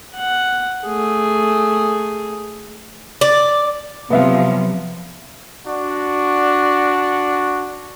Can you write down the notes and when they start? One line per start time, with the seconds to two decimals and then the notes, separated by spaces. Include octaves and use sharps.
0.16 F#5
0.87 A3 G#4
3.21 D5
4.10 C3 F3 F#3 B3 E5 F5
5.66 D4 F#4